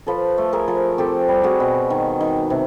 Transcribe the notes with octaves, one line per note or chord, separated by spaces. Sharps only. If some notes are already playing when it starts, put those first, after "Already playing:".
F3 A4 B4
A3
G#4 A#4
F3
C4 G4 A4
G3
F#4 G#4
B2
D#3
D#3
C3